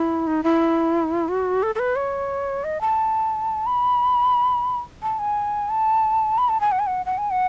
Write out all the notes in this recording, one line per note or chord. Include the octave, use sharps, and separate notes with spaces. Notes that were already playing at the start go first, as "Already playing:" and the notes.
Already playing: E4
D#4
E4
F#4
A4
A4
B4
C#5
D#5
A5
B5
A5
G#5
A5
B5
A5
G#5
F#5
G#5
F#5
F#5
G#5
F#5